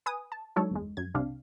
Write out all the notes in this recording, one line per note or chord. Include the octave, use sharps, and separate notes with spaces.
B4 G#5 D#6
A5
F#3 G#3 D4 D#4 A4 C#5
G1 E2 G#3
F#2 G#6
C2 C3 C4 D4 F5